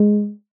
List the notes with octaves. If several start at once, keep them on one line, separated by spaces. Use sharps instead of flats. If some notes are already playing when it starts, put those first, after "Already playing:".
Already playing: G#3